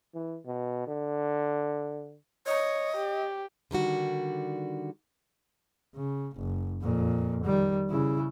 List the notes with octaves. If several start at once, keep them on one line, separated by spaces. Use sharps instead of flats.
E3
B2
D3
C#5 D#5
G4
D3 D#3 G3 F#4
C#3
F#1
F2 A#2
D#3 G3
C#3 E4